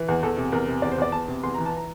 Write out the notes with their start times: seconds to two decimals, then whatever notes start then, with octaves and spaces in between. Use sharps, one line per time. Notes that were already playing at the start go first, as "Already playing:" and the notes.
Already playing: E3
0.08 E2
0.23 E2 A4
0.37 C3
0.52 E2 A#4
0.68 C3
0.82 E2 D5
0.92 C5
0.98 E2 D5
1.12 E2 A5
1.28 C3
1.43 E2 C6
1.54 E3 A#5
1.66 A5
1.77 A#5